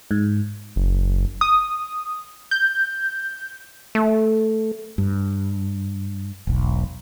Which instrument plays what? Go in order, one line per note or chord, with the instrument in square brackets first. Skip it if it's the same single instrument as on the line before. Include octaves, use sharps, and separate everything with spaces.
[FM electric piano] G#2
[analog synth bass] F#1
[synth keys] D#6
G6
[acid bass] A3
[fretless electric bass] G2
E1 B1